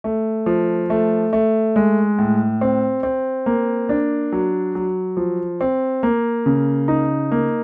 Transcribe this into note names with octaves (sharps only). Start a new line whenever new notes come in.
A3
F3
A3
A3
G#3
A2
C4
C4
A#3
D4
F#3
F#3
F3
C4
A#3
C#3
D#4
A#3